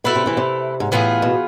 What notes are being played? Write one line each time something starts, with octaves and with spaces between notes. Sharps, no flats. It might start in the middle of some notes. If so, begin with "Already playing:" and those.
B2 A3 E4 B4
C3
C3 E3
C3
G#2
A2 E3 B3 F4 G#4
B2